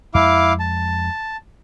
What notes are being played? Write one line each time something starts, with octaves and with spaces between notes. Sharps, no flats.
F2 G#3 E4 F5 D6
A5